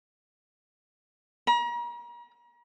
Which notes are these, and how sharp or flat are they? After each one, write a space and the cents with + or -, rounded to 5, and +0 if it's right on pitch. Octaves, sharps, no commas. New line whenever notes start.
A#5 +40